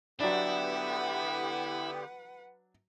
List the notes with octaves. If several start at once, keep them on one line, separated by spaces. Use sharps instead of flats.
D3 F#3 B3 D4 E4 G4 B4 F#5